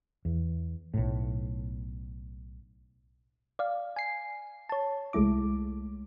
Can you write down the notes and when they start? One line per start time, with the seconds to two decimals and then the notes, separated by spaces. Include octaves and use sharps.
0.25 E2
0.94 B1 A2
3.59 D5 F5
3.96 G#5 C7
4.69 C#5 A5
5.13 C2 G#3 A3 E4 D6